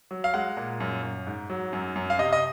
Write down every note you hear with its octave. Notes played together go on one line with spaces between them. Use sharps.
F#3
F5
G#3 F#5
A#2
F#2
F#2
G#2
F#3
F#2
F#2
F5
C3 D#5
D#5